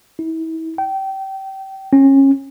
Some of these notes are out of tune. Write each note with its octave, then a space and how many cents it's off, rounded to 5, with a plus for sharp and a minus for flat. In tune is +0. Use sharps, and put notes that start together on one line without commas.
E4 -35
G5 -25
C#4 -25